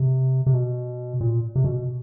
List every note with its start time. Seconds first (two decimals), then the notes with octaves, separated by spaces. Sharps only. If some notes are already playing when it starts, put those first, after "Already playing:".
Already playing: C3
0.46 C3
0.54 B2
1.21 A#2
1.55 C3
1.64 B2